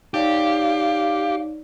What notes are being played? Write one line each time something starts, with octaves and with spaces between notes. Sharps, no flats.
D#4 G4 C#5 D5 F5